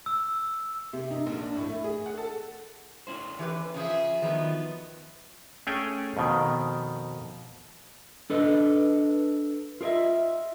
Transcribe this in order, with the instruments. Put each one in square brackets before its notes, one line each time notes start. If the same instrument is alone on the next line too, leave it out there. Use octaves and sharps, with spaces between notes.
[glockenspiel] E6
[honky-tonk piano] C3
D#4
A#1
D4
A2
A3
G#4
F#5
A4
[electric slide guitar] C#4 E4 C5
[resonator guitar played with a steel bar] E3 G4 B4
[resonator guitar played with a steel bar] C#3 F3 [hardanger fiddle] G#4 E5
[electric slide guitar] D#3 D#4 [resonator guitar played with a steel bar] F3 F#3 [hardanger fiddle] B3
[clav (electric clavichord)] A3 C#4 G#4 C#5 G5 G#5
F2 B2 D#3
[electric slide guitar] D4 A4 B4 D#5
F4 G#4 A#4 D#5 E5